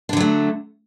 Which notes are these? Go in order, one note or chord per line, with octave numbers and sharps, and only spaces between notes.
D3 F#3 A3 D4